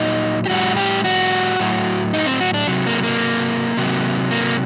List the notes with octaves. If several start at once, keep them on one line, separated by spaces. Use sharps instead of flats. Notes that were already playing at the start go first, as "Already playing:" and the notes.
Already playing: A#2 F#3 D#4
G4
A2 G3 F#4
G4
F#4
A2 F#3
D#4
C4
F#4
D4
C3 F#3
A#3
A#3
C3 F#3
A#3